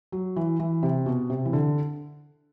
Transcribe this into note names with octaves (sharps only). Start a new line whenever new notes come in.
F#3
E3
E3
C3
B2
C3
E3
D3